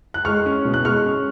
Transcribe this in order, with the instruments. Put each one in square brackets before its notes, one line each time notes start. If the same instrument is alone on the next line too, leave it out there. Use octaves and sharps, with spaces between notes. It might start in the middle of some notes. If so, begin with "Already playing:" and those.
[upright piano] F#6
G#3 C#6 F6
C#4
B2
F#6
G#3 C#6 F6
C#4